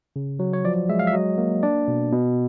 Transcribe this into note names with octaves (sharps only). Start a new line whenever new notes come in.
C#3
F#3
C#5
F3 D5
G#3 E5
F5
E5
F#3 D#5
A#3
D4 D5
B2
B2